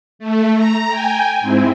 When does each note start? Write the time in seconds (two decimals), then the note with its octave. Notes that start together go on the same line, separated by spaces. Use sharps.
0.19 A3
0.56 A#5
0.89 G5 G#5
1.41 G#2 C4 E4